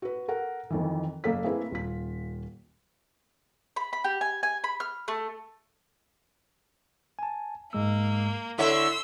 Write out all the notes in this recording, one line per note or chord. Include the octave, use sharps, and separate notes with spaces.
F#4 B4
A4 A#4 F#5
F2 D#3 E3
F#1 A#3 A4 F5 B6
A3 A#3 C4 E4 G#4 B4
D#1 F4 B6
B5
B5
G4
G#5
G#5
B5
F6
A3
G#5 A5
G#2 G#3 A#3 E6
D3 E4 A4 C#5 E5 C6 E6